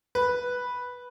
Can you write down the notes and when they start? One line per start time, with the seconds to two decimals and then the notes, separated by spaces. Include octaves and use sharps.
0.15 B4